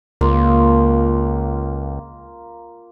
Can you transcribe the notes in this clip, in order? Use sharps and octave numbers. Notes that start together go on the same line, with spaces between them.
C#2 A#3 F4